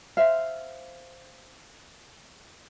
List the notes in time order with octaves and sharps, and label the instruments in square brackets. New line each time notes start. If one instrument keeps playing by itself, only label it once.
[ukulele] C5 E5 F5